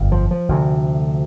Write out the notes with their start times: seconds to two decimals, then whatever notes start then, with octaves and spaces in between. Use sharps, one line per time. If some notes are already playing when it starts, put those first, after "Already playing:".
Already playing: G1 F2
0.12 F3
0.31 F3
0.49 D2 C3